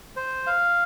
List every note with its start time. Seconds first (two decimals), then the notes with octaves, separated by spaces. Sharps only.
0.16 C5
0.47 F5